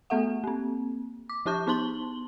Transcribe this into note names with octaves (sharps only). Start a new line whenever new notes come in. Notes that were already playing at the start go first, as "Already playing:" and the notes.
A3 B3 A4 E5 F#5
A#3 C4
D6
F3 E4 G4 A5 C#6 G6
B3 D#4 A5 C6 F#7 G7